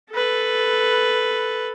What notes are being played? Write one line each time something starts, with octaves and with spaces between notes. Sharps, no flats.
A4 B4